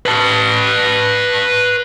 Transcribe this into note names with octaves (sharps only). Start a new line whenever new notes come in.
B4 A5